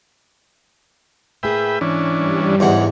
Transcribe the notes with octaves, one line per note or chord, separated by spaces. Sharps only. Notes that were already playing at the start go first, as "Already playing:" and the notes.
A2 A#3 G#4 B4 E5 G5
G#2 E3 C#4 D4
G2 G3
E2 G#2 E3 F4 C#5 F#5